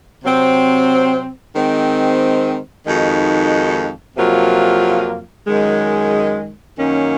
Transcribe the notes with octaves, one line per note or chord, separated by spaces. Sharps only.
C3 F#3 C4
D#3 G#3 C4
F2 D#3 G#3 D#4 F#4
F2 C3 F#3 A#3 F4
F#2 D#3 G#3
F#2 D#3 A#3 C#4